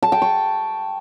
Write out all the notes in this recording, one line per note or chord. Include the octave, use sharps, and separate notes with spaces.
A5
G5
C#6